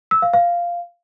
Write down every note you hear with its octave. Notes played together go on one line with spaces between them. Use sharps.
E6
F5
F5